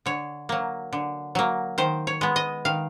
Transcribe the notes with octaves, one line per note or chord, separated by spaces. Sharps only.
D3 C#5
F#3 A#3
D3
F#3 A#3
D#3 C5
C#5
G#3 B3
D#5
D#3 F5